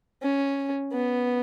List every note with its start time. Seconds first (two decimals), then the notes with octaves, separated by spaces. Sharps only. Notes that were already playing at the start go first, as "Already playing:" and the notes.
0.22 C#4
0.92 B3